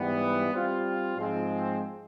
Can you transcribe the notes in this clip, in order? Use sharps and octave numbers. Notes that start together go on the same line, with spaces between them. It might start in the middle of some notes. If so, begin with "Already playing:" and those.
Already playing: G#2 E3 G3 B3
G3 C4 F4
G#2 F3 G#3 C4